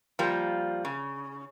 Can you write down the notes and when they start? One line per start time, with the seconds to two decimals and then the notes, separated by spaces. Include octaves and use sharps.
0.19 F3 G3 A#3
0.85 C#3